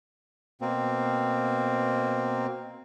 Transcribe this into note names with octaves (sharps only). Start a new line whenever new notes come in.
B2 A#3 C4